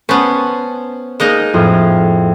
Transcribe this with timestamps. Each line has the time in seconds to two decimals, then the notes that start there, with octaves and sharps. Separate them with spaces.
0.09 B3 C#4 C5 A5
1.20 G#3 A#3 D#4
1.54 F2 A2 D#6